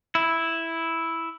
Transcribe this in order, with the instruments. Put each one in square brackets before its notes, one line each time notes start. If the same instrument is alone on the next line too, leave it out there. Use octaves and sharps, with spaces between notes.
[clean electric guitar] E4